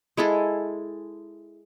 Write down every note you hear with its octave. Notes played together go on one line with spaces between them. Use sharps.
G#3 E4 G#4 A4